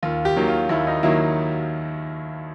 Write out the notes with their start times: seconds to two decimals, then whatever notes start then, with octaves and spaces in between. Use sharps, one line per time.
0.03 D#2 F4
0.25 G4
0.36 D#3 F#3 A#3
0.48 F4
0.69 D#2 E4
0.87 D#4
1.03 D#3 F#3 A#3 E4